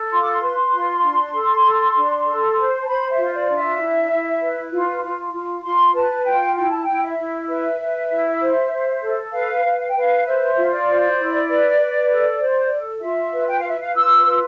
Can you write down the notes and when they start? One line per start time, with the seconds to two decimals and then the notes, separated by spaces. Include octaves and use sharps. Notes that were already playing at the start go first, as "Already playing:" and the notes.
Already playing: A4
0.11 F4 C6
0.21 D6
0.32 C6
0.42 B4
0.73 F4
1.03 D4
1.34 A4
1.65 A4
1.95 D4
2.26 A4
2.57 C5
2.83 A5
2.88 C5 B5
3.11 E5
3.18 F4
3.26 E5
3.33 D5
3.50 D4
3.57 E5
3.80 E4
4.11 E4
4.41 B4
4.73 F4
5.03 F4
5.34 F4
5.64 F4 C6
5.95 B4 A5
6.26 F4 G5
6.56 E4 G5
6.71 A5
6.85 E4 G5
7.03 E5
7.18 E4
7.48 B4 E5
7.80 B4
8.11 E4
8.41 C5
8.72 C5
9.02 A4
9.33 B4 F5
9.64 B4
9.80 F5
9.89 G5
9.95 B4 F5
10.25 C5 E5
10.56 F4
10.71 D5
10.87 C5
11.17 E4
11.49 B4
11.79 B4
12.10 A4
12.40 C5
12.71 A4
13.02 F4 E5
13.33 B4
13.48 G5
13.59 B4 F5
13.69 E5
13.80 F5
13.95 F4 E6
14.25 B4